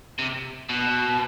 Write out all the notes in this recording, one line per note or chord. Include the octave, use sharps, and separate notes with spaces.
C3
B2